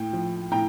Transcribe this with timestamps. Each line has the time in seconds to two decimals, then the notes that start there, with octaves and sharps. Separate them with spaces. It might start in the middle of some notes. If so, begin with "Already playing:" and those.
Already playing: A2 G5
0.13 F3
0.51 A2 G5 A#5